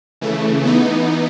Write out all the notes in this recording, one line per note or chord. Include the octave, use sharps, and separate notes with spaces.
C#3 E3 A3
E3 B3 D#4